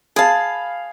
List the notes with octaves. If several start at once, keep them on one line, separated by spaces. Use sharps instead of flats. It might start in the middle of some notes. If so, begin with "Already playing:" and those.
G#4 F5 A5 B5